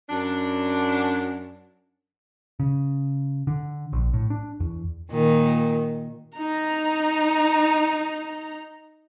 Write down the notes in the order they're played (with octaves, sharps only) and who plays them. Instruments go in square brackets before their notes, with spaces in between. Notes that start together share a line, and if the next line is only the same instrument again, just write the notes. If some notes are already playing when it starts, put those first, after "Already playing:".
[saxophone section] F#2 D4
[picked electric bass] C#3
D3
A#1
A2
D4
E2
[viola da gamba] A#2 D#3
[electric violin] D#4 A#5